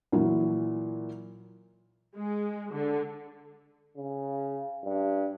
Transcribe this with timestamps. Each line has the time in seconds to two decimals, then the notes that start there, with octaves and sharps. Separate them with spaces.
0.12 A#2 E3 F#3
2.16 G#3
2.74 D3
3.97 C#3
4.85 G2